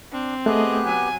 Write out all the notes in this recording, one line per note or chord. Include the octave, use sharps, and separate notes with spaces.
C4 D4
A3 B3 G4 G#4 D#5 F#6
F#3 G#5